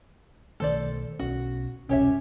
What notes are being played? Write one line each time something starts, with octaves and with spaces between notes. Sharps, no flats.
B1 D#3 A3 A4 C5 D5
B1 C#4 F#4
E1 C2 C#4 G4 C#5 E5